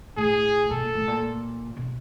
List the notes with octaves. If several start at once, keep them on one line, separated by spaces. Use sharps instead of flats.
A2 G#4
B2 A4
A#2
A2
A#2
B2